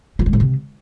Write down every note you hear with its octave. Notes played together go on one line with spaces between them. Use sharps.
F3
G#3
A2
C3